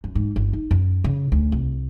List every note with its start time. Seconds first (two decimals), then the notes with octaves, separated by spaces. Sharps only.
0.04 F#2
0.15 G#2
0.36 G1
0.53 D#4
0.71 F#2
1.04 C#3
1.32 D2
1.52 C2